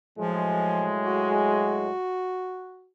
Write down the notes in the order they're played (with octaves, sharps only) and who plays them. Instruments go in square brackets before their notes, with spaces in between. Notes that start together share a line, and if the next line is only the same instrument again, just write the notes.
[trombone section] A2 F#3 G#3 [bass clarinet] F3
[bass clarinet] F#4